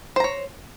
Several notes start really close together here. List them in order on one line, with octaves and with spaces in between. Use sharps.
C5 A#5 C#5